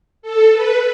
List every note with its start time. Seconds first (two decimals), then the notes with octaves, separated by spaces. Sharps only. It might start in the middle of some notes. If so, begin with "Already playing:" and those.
0.22 A4
0.51 B4